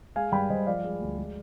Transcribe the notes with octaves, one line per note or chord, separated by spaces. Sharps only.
G#3 F5 G#5
G2 G5 B5
G2 C5 D#5
F3 D5 F5
G#3
D2
G#3